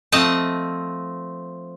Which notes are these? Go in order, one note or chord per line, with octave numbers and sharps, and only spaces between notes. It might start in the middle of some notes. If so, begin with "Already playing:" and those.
F3 A3 C4 D#5 A5